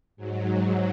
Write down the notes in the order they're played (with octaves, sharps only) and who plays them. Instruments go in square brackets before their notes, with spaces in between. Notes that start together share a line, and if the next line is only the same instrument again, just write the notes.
[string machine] G#2 F#3